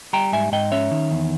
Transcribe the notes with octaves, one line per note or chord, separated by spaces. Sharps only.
G3 G5 A#5
G#2 E5 G#5
G#2 D#5 G5
C#4 C#5 E5
D#3
E2